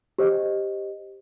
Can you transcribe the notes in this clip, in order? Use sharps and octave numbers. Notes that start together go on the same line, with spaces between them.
G4 C5 D#5